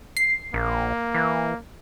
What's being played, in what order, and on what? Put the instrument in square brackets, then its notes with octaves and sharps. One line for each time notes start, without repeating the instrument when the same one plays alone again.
[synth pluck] C7
[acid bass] A#1 [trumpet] A#3
[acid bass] E3